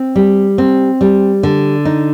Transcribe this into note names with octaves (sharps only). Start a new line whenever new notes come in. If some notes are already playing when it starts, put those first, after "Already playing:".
Already playing: C4
G3
C4
G3
D3
D#4